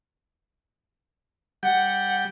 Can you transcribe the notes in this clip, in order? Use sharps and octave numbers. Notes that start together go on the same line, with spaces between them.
G3 F#5 G5